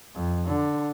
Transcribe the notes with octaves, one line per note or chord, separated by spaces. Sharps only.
F2
D3